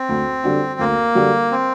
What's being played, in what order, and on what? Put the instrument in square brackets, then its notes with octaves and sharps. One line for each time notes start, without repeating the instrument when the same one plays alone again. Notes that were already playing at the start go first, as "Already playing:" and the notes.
Already playing: [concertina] C4
[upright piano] D2
D3 G3 D4 F#4
[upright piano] D2 [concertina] A#3
[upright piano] D3 G3 D4 F#4
[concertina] C4